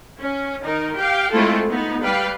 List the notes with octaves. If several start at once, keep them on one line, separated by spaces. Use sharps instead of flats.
C#4
D#3 D#4 A#4
G4 F5 G5
G#3 A3 C4 E4 F4 A4
B3 D#4
G3 B4 F5 G5